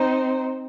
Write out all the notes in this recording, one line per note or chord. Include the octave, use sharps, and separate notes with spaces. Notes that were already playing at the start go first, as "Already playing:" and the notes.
Already playing: C4 D#4